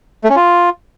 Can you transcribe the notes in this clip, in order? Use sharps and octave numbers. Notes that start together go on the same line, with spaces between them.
A3
C#4
F4